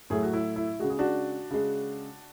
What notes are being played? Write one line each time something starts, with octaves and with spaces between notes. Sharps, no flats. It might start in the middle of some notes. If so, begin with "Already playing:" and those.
A2 F#3 A3 G#4
F#4
E4
E4
C#3 G#3 F#4
G#4
D4 F#4
C#3 G#3